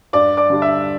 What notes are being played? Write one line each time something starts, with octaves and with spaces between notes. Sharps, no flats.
G2 D5 D6
D5 D6
D3 G3 D4
E5 E6